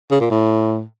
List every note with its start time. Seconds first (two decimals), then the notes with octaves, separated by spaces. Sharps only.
0.11 C#3
0.21 A#2
0.31 A2